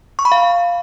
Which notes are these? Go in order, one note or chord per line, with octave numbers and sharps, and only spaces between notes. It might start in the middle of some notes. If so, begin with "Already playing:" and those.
C#6
B5
F5